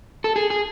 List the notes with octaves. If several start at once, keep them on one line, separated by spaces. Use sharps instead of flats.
A4
G#4
G#4